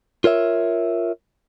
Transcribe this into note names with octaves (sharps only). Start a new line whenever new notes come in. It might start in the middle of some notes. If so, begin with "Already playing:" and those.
F4 A#4 C#5 E5